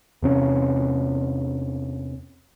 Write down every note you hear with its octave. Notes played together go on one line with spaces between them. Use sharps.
E2 C3 C#4